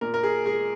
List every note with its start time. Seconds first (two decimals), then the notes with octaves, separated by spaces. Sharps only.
0.01 A#2 A#4
0.14 A#4
0.23 G#4
0.46 G#3 G#4